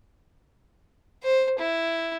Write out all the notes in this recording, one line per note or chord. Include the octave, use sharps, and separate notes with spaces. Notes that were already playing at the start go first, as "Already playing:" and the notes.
C5
E4